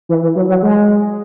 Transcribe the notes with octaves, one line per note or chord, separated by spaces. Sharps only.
E3
E3
F#3
F#3
G#3